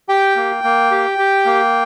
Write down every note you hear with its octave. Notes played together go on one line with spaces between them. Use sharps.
G4 G5
A#3
A#3
G4
G4
A#3